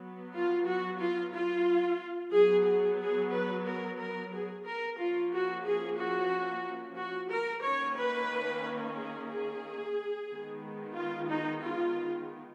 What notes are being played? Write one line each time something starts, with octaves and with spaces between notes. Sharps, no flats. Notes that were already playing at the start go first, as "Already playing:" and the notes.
Already playing: F#3 B3
F4
F#4
F4
F4
F#3 B3 G#4
G#4
G#4
B4
A#4
A#4
G#4
A#4
F3 A#3 C#4 F4
F#4
G#4
F#4
F#4
A#4
D#3 A#3 C#4 C#5
B4
G#4
G#4
D#3 G#3 B3
F4
D#4
F4